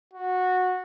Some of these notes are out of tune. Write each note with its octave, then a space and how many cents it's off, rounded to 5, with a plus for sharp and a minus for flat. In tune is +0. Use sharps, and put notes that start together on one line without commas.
F#4 -15